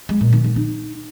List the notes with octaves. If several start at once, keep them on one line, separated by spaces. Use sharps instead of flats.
G#3
A#2
D#3
D#3
D#4